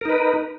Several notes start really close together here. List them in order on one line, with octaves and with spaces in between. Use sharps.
A#4 D#4 B4